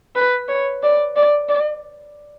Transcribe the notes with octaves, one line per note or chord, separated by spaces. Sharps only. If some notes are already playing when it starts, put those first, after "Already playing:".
B4
C#5
D5
D5
D5